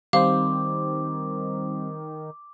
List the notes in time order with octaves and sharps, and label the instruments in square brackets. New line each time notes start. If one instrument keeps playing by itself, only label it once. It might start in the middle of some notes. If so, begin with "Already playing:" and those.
[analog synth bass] D#3 [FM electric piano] G3 C4 C5 [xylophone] F5 [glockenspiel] D6